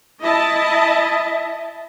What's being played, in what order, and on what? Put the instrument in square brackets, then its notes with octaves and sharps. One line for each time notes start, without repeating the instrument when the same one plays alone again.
[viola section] E4 D#5 A5 [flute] E5